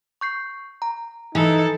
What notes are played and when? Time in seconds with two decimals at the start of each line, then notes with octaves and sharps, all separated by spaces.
0.21 C#6 G6 C7
0.82 A#5
1.35 E3 D#4 A4